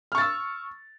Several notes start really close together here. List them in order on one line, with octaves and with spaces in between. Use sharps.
F6 C#6 A6 E6